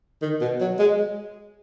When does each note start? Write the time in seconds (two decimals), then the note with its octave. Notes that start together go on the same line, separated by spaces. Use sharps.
0.22 D#3
0.41 B2
0.61 F#3
0.79 G#3